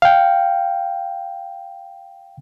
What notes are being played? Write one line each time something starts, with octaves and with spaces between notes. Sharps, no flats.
F5 G5